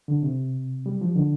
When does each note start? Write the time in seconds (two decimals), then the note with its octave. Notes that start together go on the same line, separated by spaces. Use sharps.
0.08 D3
0.23 C3
0.86 G3
1.01 F3
1.16 D3